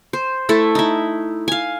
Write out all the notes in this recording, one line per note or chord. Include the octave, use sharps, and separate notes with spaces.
C5
A3 E4 A4
D#4 E4
F5 G#5